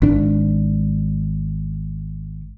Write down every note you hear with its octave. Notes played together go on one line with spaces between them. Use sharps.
G#1 D4